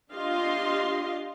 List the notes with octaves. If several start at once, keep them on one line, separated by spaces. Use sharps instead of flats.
D4 F4 G4 D#5 F5 C6